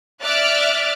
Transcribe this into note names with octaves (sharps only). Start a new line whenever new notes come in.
D5 E5 D6 F6 F#6 A6